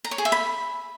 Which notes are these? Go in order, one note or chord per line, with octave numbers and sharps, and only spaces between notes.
A#5
C#5
G#4
E5
B5